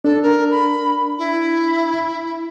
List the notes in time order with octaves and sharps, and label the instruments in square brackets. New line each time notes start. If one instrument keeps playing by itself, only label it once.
[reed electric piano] D4 [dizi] A4
[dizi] A#4
B5
E4